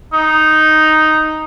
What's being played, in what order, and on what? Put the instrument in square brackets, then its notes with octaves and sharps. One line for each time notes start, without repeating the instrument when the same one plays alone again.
[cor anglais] D#4